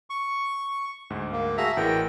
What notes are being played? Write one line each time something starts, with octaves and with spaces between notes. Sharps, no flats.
C#6
D2 G#2
A#3
F#4 G#4 E5 F5 A5 A#5
A1 E3 A#4 F#5 G5